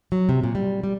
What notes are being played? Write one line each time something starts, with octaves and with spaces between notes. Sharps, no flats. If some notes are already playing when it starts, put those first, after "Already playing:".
F#3
C3
A#2
G3
G3